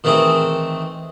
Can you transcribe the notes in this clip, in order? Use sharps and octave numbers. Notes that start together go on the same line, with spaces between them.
D#3 E3 A3 C4 G#4